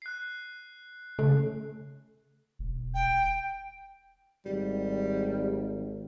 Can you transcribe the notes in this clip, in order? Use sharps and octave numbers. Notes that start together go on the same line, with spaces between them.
F#6 C7
C#3 A3
E1
G5
G#1 G3